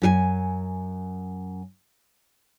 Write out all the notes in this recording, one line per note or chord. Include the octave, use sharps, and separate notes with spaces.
F#2 G4 G#5